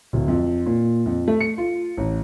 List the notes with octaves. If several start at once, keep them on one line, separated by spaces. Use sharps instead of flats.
D1
F2
A#2
F2
A3
C#7
F4
A1